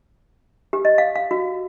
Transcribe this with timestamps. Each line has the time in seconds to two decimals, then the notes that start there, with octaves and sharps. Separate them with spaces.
0.73 G4
0.85 D#5
0.98 F5
1.16 F5
1.31 F#4